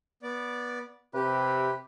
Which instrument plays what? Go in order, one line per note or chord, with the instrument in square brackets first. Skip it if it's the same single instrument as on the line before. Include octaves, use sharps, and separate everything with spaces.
[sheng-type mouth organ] B3 D5
[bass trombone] C3 [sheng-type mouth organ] G4 [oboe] B4